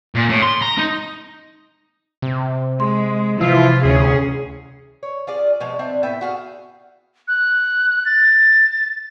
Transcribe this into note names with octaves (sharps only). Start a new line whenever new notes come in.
A#2
A2
C6
A#5
D#4
C3
G#3 C6
C3 E3 F3 E4 F4
D2 C#4 G#4
C#5
F4 G#4 D5
B2 F3 G#3
C4 D4 E5
A2 B3 E5 G5
F#4 G#4 F5
F#6
A6